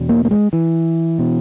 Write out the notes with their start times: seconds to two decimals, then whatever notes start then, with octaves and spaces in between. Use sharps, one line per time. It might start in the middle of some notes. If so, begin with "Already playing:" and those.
Already playing: E2 B2
0.09 A#3
0.25 A#3
0.31 G#3
0.53 E3
1.19 B2